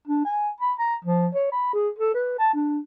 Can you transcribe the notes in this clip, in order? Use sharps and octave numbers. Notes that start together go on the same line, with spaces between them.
D4
G#5
B5
A#5
F3
C#5
B5
G#4
A4
B4
A5
D4